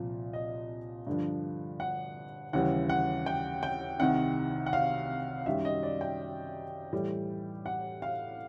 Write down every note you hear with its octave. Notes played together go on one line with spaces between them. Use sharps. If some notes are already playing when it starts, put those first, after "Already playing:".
Already playing: C2 A#2 F3
D#5
G2 D3 F3
F#5
D#2 C#3 E3 G3 F#5
F#5
G5
G5
C2 C3 D#3 F#5
F#5
F5
F#2 D#3 G3 E5
D#5
D5
G5
A2 E3 G3
F#5
F5